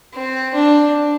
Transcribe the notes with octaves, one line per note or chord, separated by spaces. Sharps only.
C4
D4